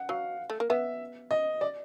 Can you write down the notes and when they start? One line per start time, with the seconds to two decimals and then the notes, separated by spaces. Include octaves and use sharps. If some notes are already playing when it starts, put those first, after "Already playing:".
Already playing: F#5
0.09 F#3 F5
0.50 A3
0.60 A#3
0.70 B3 E5
1.31 D#5
1.61 D5